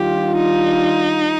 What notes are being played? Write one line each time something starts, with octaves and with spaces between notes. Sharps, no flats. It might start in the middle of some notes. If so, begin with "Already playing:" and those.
Already playing: D#3 G3 D4 F4 G4
D#4